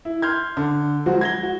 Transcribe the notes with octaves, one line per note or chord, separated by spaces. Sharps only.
E4
C6 F6 G6 G#6
D3
F3 F#3 G#3 F#4 C5
G#6 A#6 G7
F#4